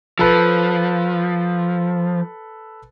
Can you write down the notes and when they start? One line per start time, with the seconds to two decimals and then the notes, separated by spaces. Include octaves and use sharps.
0.19 F3 A4 B4